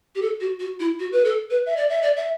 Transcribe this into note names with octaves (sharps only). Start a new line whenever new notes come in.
G4
A4
F#4
F#4
E4
F#4
B4
A4
B4
E5
D5
E5
D5
E5